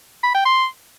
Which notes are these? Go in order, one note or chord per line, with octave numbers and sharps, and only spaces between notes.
B5
G5
C6